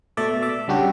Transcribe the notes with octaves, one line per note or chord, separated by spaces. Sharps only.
B2 A3 A4 D5 E5
E5 D6
C#3 G3 D4 F#4 G4